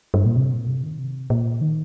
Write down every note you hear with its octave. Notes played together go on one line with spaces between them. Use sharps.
G2
A#2
C3
A#2
C3
D#3
C3
A#2
D#3